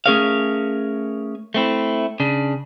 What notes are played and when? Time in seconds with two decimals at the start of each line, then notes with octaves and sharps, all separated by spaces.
0.06 A3 C#4 G#4 A#4 C#5 F5
1.54 A3 C4 E4
2.20 C#3 D4